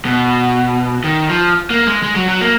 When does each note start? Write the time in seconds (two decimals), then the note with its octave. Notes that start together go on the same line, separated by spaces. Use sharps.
0.05 B2
1.04 D#3
1.29 F3
1.70 A#3
1.87 G#3
2.03 G#3
2.15 F#3
2.28 F#3
2.41 A#3